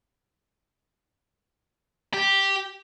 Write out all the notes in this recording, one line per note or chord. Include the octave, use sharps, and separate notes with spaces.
G4